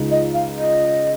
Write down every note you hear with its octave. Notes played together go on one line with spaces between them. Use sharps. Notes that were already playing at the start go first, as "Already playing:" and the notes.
Already playing: C#2 C#3 G#3 D#4
D#5
F5
D#5